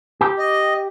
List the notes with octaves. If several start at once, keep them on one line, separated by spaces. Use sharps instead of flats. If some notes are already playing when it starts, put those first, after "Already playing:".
G4
D#5